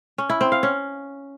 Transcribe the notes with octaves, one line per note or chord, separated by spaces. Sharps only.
C#4
E4
C4
F5
C#4